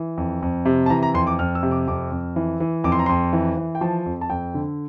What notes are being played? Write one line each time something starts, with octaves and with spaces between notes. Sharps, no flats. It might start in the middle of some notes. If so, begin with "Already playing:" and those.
Already playing: E3
F2
F2
C3
A5
E3 A#5
A#5
F2 C6
D6
F2 F6
E6
C3
D6
F2 D6
F2
E3
E3
F2 D6
C6
A#5
F2 C6
E3
E3
G5
F3 A5
F2
A5
F2 G5
D3